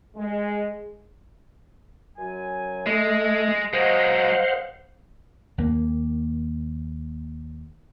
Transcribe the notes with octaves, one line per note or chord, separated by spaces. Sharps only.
G#3
F#2 F#3 G#5
G#3 A3 D#5
F#3 G#3 C5 F5 F#5
D#2 A#3